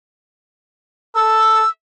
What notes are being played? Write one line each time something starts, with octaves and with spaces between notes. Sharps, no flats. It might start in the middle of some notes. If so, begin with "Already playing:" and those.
A4 E6